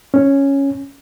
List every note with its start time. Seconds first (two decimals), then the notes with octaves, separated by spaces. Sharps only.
0.14 C#4